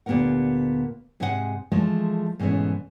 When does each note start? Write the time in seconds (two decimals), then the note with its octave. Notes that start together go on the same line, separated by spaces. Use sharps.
0.06 D2 A#2 B3 G4 A#4 F#5
1.20 G#2 C3 G#3 G#4 C#5 F#5
1.72 E3 F3 G#3 A3
2.39 G#2 B2 E3 A3 C#4